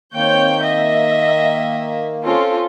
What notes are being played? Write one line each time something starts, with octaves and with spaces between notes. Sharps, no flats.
D#3 A#3 C4 C#5 G5 G6
D#5 E5
C4 C#4 F4 A4